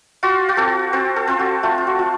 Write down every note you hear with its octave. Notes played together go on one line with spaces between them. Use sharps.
F4 F#4
F#4
C4 A4
C4 C5
A4
C4 F4
F#4
A3 F4
F4
F#4
F4